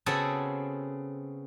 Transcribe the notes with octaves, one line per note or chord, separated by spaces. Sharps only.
C#3 B3 C4 F#4 G#4 A4